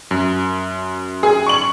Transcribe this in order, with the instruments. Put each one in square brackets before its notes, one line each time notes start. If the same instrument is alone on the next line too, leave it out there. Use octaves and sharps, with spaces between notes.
[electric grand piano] F#2
[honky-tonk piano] G#4
C#6 F#7